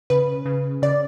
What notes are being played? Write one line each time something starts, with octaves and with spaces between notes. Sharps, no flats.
C#3 B4
C#3
C#3 D5